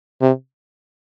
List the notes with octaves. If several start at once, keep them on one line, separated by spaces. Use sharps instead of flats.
C3